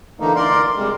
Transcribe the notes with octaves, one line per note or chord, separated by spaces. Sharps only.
D3 E3 A3 A#3 D#4
A#4 D5 C6
C3 G3 G#3